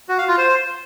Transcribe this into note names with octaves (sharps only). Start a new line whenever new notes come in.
F#4
F5
F4
C5